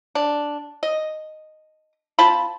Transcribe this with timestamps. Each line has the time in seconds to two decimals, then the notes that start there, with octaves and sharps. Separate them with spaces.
0.15 D4
0.83 D#5
2.19 C4 F4 A5 B5